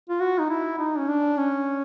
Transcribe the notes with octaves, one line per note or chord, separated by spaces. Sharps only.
F4
F#4
D#4
E4
D#4
C#4
D4
C#4